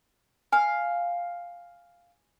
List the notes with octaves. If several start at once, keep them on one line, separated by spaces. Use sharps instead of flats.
F5 G#5